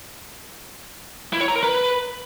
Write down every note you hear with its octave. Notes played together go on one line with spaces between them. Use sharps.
E4
C#5
A#5
A#4
B4